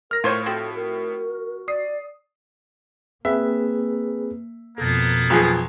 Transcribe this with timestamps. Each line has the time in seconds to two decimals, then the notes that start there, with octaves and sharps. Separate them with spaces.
0.11 A#4 F6 A#6
0.24 A2 F4 C5 C#5
0.46 F3 C4 F#4 A4
0.75 A#4
1.68 D5 D#6 C7
3.25 A#3 C4 G#4 B4 E5
4.78 F2 B2 A#3 B3 A4
5.30 B1 F3 G#4